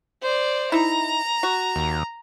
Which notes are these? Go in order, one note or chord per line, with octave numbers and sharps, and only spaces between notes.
C5 D5
D#4 E4 A#5
F#4
D#2